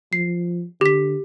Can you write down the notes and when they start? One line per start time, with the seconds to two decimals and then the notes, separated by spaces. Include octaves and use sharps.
0.13 F3 C7
0.81 D3 G4 B6